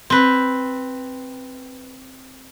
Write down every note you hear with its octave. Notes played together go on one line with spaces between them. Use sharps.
C4 B4